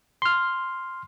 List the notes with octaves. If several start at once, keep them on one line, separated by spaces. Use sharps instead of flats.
C6 F6